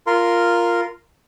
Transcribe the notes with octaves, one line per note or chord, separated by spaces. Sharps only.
F4 A#4 C6